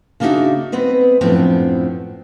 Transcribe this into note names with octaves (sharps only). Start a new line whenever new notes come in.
C#3 A#3 D4 D#4 F#4 E5
B3 C4 B4 D#5
F#2 A2 F3 B3 C4 D4